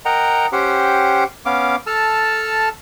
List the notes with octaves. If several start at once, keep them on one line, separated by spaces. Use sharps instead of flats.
A#4 D#5 F#5 G5 A#5
C#4 G4 C5 F#5 G5
B3 C#4 F5 D6
A4 A5 E6 F6